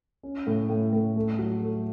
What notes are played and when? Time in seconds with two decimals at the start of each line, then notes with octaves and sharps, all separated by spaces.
0.23 C#4
0.47 A2
0.69 A2
0.93 A2
1.16 A3
1.39 F#3
1.62 A3